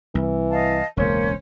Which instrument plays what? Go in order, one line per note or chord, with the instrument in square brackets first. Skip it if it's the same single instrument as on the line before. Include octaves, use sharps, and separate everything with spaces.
[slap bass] C2 [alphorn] E3
[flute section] D#5 F5 A5
[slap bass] E1 C#2 G#2 [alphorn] A#3 [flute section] C#4 C5